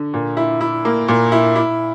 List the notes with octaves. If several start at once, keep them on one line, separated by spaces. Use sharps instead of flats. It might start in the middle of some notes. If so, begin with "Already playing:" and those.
Already playing: D3
A#2
E4
E4
A#3
A#2
E4
E4